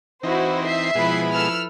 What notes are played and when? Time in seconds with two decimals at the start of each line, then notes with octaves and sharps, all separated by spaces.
0.23 E3 C4 D#4 E4 F#4 C5
0.65 E5 C7
0.95 B2 F3 G#3 E4 B4
1.32 A4 E6 F6